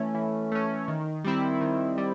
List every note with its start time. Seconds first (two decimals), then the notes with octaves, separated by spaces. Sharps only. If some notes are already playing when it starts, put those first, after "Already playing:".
Already playing: E3 A3 C#4
0.15 E3
0.51 A3 C#4
0.88 D#3
1.24 G3 C4 E4
1.61 D#3
1.98 G3